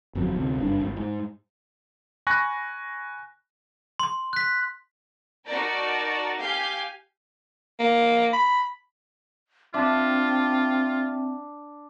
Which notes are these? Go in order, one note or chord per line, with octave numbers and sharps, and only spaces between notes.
G1 F2 F#3
D2 C3
F#1 G2 D4
G#1 G#2
G#2
G#5 B5 C#6 F#6 A#6
C6
F#6 B6
D#4 F#4 A#4 D5 A5 A#5
G4 F5 G#5 G6
A#3
B5
C4 D4 F4 E5 A5